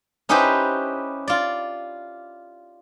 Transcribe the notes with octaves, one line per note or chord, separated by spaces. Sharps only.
C#4 D#4 E4 G4 B4 C5
F4 D5